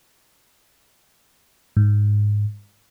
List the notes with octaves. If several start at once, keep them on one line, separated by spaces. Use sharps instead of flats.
G#2